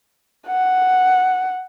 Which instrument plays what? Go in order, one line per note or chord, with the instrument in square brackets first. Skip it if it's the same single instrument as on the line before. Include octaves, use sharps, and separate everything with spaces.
[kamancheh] F#5